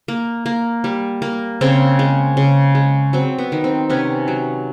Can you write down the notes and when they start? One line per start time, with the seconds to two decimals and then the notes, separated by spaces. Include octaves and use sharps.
0.08 A#3
0.46 A#3
0.84 G3
1.22 A#3
1.61 C#3 C4
1.99 G#3
2.37 C#3
2.75 G#3
3.13 F#3 C4
3.38 B3
3.52 D#3
3.64 C4
3.90 C3 B3 C#4
4.28 F#3